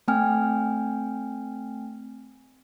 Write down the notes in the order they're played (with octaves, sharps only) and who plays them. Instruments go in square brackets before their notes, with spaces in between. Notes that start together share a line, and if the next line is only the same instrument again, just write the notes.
[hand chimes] A3 C4 G5 G#5 F6